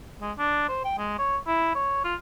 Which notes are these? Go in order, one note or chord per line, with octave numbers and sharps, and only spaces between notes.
G#3
D4
C5
G5
G#3
C#5
E4
C#5
F4